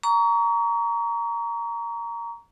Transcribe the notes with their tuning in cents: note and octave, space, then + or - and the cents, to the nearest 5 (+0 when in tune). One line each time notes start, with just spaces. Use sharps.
A#5 +0 C#6 +35